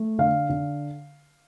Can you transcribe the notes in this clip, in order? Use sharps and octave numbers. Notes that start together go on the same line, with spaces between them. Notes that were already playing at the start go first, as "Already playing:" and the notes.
Already playing: A3
D3 F5
D3